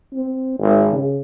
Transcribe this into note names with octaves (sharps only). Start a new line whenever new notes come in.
C4
G#1
C#3